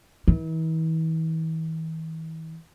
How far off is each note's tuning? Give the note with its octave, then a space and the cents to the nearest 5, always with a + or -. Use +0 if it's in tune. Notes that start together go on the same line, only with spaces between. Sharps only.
E3 -45